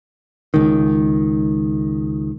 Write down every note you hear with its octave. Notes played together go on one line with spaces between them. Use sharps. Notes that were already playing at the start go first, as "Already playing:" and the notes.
C#2 D#3